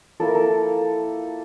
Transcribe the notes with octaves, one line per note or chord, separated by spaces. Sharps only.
F3 A#3 E4 A4
A#4
A4